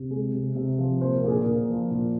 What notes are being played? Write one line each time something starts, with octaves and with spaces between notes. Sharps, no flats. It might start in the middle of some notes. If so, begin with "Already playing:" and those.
Already playing: C3
G#3
C3
C3
F3
A#2 C5
A#4
A#2 G#4
A#2 A#4
F3
A#2